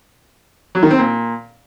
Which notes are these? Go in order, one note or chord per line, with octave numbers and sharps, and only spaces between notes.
F#3
D#3
C4
A#2